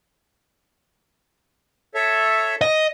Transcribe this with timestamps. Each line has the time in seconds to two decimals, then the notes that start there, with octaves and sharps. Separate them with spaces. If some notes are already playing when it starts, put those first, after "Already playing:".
1.95 A4 C#5 E5
2.61 D#5